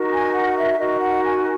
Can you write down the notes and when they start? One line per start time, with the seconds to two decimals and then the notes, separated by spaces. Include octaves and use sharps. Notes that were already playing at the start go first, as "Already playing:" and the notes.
Already playing: D#4 F#4 A#4
0.12 G#5
0.34 F#5
0.56 E5
0.79 D#4 F#4 A#4 D#5
1.01 F#5
1.23 G#5